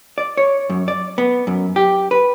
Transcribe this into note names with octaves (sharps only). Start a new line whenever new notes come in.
D5
C#5
F#2
D5
B3
F#2
G4
B4